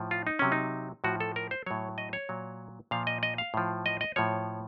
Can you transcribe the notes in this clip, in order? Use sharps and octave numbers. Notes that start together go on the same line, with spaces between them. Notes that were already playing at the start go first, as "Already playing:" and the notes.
Already playing: A2 F3
F4
D#4
C3 F#3 C#4
D#4
A2 F3 F#4
A4
A#4
C5
A2 F#3 C#5
D#5
C#5
A#2 F#3
A#2 F3 F5
D#5
D#5
F5
A2 F3
D#5
D#5
A2 F3 C#5